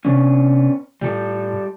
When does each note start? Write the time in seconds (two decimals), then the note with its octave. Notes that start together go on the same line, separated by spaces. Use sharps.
0.05 C3 B3 C#4 D4
1.01 A2 G3 A4